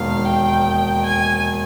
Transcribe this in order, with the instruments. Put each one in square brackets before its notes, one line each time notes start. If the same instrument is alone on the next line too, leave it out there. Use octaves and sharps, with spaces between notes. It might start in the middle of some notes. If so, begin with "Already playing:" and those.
Already playing: [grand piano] E1 D#2 D#3 [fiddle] F5
[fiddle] G5
G#5